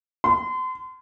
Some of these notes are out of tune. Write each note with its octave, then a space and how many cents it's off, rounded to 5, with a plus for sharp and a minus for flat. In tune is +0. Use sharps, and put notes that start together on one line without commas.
C6 -35